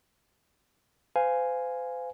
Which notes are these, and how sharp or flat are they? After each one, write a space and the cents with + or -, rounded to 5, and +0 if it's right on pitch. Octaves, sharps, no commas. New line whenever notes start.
C5 -40 F5 +0 G#5 +0